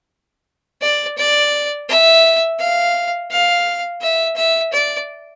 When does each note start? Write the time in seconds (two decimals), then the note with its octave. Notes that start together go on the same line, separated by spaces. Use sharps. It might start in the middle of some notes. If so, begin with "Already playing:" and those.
0.82 D5
1.18 D5
1.89 E5
2.59 F5
3.31 F5
4.01 E5
4.36 E5
4.73 D5